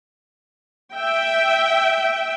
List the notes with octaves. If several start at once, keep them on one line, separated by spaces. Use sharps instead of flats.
E5 G5